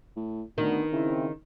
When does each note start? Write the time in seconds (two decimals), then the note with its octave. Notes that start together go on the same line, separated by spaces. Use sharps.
0.16 A2
0.58 D2 D#3 B3 D4
0.92 C#3 C4 E4